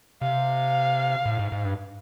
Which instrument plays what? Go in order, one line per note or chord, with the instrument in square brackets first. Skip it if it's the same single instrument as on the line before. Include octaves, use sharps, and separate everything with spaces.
[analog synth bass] C3 [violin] F5
[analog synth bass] A2
G#2
G#2
G2